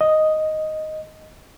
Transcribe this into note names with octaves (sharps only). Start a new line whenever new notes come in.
D#5